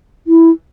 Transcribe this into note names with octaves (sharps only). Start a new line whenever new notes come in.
E4